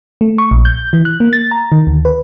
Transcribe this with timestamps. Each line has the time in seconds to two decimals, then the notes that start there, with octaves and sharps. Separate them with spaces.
0.21 A3
0.38 C#6
0.51 A#1
0.65 G6
0.93 E3
1.05 F#6
1.20 A#3
1.33 A6
1.51 A#5
1.72 D#3
1.87 D2
2.05 B4